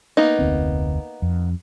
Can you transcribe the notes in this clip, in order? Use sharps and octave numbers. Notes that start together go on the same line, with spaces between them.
A#3 B3 D#4
F1 D2 C4
F2